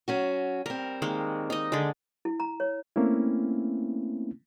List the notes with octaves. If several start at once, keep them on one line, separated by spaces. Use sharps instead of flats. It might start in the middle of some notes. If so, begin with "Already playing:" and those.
F#3 C#4 F#4
G3 C4 A#4
D#3 G#3 A#3
D#4 D#5
D3 G#3
E4
A#5
C#5
A3 A#3 C4 C#4 E4